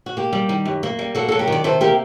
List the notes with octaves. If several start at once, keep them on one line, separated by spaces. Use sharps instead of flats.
F#4
A#3 G4
G3
D#3
F#2
A#3
G3
A#3 F#4 A4
F#3 A4
G4 A#4
D#3 D5
C3 A4 C5
A#3 G4 A#4